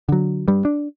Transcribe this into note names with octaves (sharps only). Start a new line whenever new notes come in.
D3 F#3
G2 G3
D4